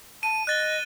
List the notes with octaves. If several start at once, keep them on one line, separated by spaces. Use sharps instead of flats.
A5 D#7
D#5 F#6 A6 G7